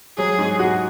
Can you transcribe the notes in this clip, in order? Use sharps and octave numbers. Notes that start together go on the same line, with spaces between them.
F#3 G#4
G#2
F#4